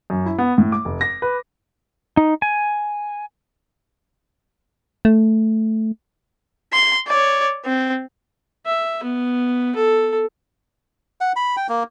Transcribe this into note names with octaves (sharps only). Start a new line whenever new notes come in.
F#2
E4
B3
A2
D6
F1
A#6
B4
D#4
G#5
A3
C6
C#5 D5
C4
E5
B3
A4
F#5
B5
G5
A#3